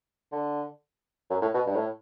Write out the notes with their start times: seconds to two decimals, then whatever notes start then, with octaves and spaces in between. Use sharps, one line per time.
0.32 D3
1.30 F#2
1.42 A2
1.54 B2
1.67 G2
1.76 A2